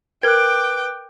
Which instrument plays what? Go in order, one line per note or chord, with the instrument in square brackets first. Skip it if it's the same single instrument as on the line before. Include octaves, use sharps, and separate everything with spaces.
[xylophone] A#4 G#6 [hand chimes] B4 F#6 [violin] G5 D6